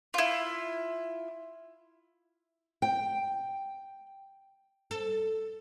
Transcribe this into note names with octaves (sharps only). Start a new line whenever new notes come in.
E4 F4
G5
A4